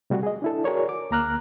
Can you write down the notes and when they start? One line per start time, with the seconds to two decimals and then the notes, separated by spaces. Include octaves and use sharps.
0.10 C3 G3 A3 F#4
0.23 G#4 D#5
0.42 D4 E4 A4
0.64 F#4 G#4 A#4 C#5 D5
0.89 D6
1.11 D2 A#3 A#5 F6 F#6